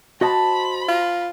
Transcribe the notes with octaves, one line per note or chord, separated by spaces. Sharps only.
F#4 C5 D#5 A5 B5
F4